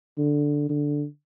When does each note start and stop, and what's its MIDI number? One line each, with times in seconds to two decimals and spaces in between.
0.18 0.67 50
0.69 1.05 50